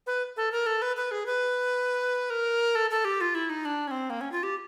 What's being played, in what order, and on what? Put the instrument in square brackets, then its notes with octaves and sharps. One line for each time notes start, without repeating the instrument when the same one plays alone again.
[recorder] B4
A4
A#4
A4
B4
B4
G#4
B4
A#4
A4
A4
G4
F4
E4
D#4
D4
C#4
C4
A#3
C#4
F4
G4